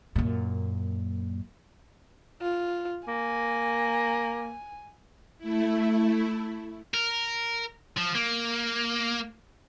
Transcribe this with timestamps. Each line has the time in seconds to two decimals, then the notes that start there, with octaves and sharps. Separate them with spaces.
0.16 F#2 A#2
2.41 F4
3.08 A#3 G#5
5.38 A3 E4
6.94 A#4
7.98 F3
8.15 A#3